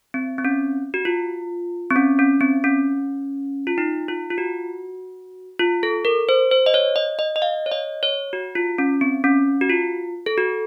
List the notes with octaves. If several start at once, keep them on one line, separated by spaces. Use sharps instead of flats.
C4
C4
C#4
F#4
F4
C4
C#4
C#4
C4
C#4
F4
D#4
F4
F4
F#4
F4
A4
A#4
C5
C5
D#5
C#5
D#5
D#5
D#5
F5
C#5
D#5
C#5
F#4
F4
C#4
C4
C#4
F#4
F4
A4
F#4